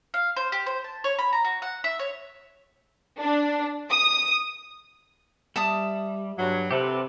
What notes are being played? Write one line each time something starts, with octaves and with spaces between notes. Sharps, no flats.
F5
C5
G4
C5
A5
C#5
B5
A#5
F#4
F#5
E5
C#5
D4
D#6
G3 E5 A5 D#6
G2 F#3
C3 G4 A4 B4